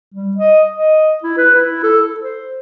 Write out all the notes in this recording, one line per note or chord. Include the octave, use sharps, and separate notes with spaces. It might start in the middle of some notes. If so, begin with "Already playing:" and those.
G3
D#5
D#5
E4
B4
E4
A4
A4
C5